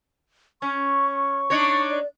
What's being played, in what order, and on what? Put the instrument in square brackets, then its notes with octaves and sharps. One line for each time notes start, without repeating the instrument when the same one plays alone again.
[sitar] C#4 [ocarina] C#6
[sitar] D4 D#4 C#5
[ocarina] D5